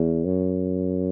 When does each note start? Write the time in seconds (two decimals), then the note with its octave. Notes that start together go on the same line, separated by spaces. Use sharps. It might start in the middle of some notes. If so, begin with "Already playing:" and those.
Already playing: E2
0.25 F#2